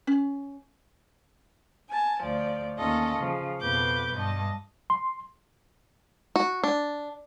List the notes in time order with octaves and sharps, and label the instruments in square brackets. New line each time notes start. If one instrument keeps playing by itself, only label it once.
[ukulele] C#4
[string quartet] G#5 A5
D2 F3 D5
D#2 C#4 F4 A4 D#5
C#3 F3
F2 B2 B4 D6 G6
G2 D#5 A5
[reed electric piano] C6
[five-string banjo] F#4
D4